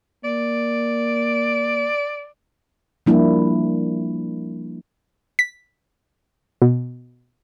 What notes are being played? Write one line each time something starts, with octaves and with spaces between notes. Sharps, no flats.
A#3 D5
F3 G3 A#3 D4 E4
B6
B2